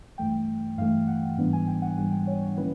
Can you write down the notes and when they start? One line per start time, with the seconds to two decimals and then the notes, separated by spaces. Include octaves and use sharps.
0.18 G2 E3 A3 G5
0.78 G2 E3 A3 F5
1.07 F#5
1.37 G#2 E3 G3 B3 D4
1.53 G#5
1.68 G5
1.82 F#5
1.97 G#2 E3 G3 B3 D4 F#5
2.11 G5
2.27 C#5
2.41 C#5
2.56 D3 F3 A#3 C#4 E4 B4